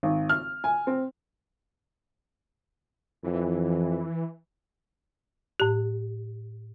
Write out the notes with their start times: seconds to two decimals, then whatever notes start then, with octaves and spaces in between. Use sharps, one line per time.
0.03 G#1
0.29 F6
0.64 G#5
0.87 C4
3.24 F2 E3
5.60 A2 G4